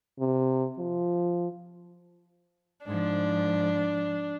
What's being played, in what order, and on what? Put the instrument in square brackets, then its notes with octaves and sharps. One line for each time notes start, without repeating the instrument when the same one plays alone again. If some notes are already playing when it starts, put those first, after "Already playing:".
[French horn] C3
F3
[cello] G#2 F3 [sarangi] D4